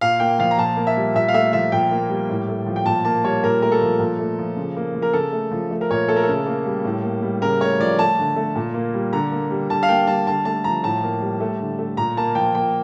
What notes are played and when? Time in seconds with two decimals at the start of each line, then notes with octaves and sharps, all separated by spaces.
0.01 A#2 F5
0.20 A#3 G5
0.39 F3 F5
0.51 A#5
0.58 A#2 A5
0.77 A#3
0.87 E5
0.97 G3
1.15 A#2 E5
1.28 F5
1.34 A3 E5
1.53 F3 E5
1.72 A#2 G5
1.92 A#3
2.10 G3
2.29 A2
2.49 A3
2.67 F3
2.76 G5
2.86 A#2 A5
3.05 A#3 A5
3.24 G3 C#5
3.43 A#2 A#4
3.62 A3 A#4
3.72 A4
3.81 F3
3.99 A#2
4.19 A3
4.39 F3
4.57 C#3
4.77 A#3
4.95 F3
5.02 A#4
5.13 C#3 A4
5.33 A3
5.51 F3
5.71 A3
5.81 A#4
5.91 A#2 C#5
6.08 A3 A4
6.16 A#4
6.23 A4
6.29 C#3
6.47 A#3
6.65 G3
6.84 A2
7.04 A#3
7.23 G3
7.42 C#3 A#4
7.61 A3 C#5
7.80 F3 D5
7.99 A3 A5
8.19 D3
8.36 A3
8.55 A#2
8.74 A#3
8.94 G3
9.13 D3 A#5
9.32 A#3
9.51 G3
9.70 D3 A5
9.83 F5
9.89 A#3 G5
10.07 G3 A5
10.27 D3 A5
10.45 A3 A5
10.64 F3 A#5
10.83 A2 A5
11.03 A#3
11.21 G3
11.40 A3
11.60 D3
11.79 A3
11.97 A#2 A#5
12.17 A#3 A5
12.35 F3 G5
12.55 A#3 G5